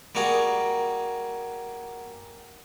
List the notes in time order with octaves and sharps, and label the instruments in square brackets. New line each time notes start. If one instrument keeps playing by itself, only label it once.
[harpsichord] G3 A#3 F#4 G#4